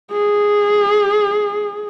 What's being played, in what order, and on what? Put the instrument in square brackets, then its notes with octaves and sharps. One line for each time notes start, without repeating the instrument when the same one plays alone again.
[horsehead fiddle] G#4